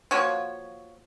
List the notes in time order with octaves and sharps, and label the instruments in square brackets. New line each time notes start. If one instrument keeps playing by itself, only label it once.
[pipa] F3 A#3 F#4 C#5